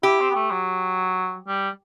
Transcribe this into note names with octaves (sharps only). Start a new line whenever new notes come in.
E4 G4
C4
B3
A3
F#3
G3